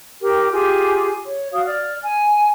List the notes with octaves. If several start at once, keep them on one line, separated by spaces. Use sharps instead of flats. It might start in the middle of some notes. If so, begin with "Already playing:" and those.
G4 A#4 G5
F4 G4 G#4
C#5
F#4 F5 D#6
D5 F6
G#5